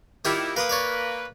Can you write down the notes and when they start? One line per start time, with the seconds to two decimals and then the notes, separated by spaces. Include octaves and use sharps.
0.25 D#3 G3 A#3 E4 F4 G4
0.57 A#3 B4 F5 C6 D#6
0.69 C#5 D5 F5